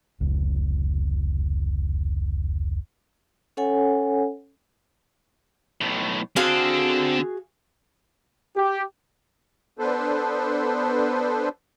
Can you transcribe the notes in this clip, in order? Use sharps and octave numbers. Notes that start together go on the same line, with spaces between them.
F1 C#2
C#4 A4 C#5 F#5 G#5
B1 A2
D3 C4 F#4 G#4 A4 F5
G4
B3 D4 A4 B4 C5